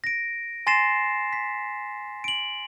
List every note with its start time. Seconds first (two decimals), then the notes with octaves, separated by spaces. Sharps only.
0.04 A#6 D7
0.67 G#5 C6 A6 A#6 C7 E7
1.33 B6
2.24 D7 F#7